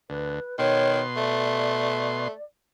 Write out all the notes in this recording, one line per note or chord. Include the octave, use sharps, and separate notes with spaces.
D2 B4
B2 D#3 C#5 C6
A3 D5